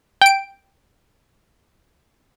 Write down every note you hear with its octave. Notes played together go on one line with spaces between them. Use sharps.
G5 D7